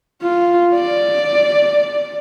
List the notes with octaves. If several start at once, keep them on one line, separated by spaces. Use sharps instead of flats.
F4
D5